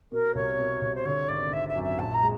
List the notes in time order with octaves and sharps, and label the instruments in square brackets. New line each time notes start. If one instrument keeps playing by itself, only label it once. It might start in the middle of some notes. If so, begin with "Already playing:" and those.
[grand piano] B2 [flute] A#4
[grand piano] C2 [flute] C#5
[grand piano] B2
C2
[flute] C5
[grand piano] D3 [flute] C#5
[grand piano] G#1 [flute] D5
[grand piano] G#1 [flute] E5
[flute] E5
[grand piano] F#2
[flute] E5
[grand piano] A#1 [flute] A5
[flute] A#5
[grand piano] G#3